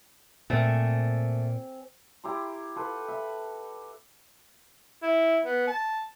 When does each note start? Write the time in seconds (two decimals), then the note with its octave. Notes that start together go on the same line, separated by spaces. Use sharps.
0.50 A#2 A3 C4 G#5
2.24 E4 G4 A#5 C6
2.76 F4 A4 B4
3.08 E5 B5
5.03 E4
5.44 B3
5.67 A5